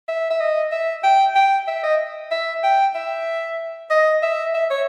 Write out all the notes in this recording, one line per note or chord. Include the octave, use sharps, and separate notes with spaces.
E5
E5
D#5
E5
G5
G5
E5
D#5
E5
G5
E5
D#5
E5
E5
C#5